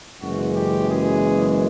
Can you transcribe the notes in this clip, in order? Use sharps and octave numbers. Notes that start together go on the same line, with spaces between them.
F#1 F#2 C#3 E3 G#3 F#4
G4
G#4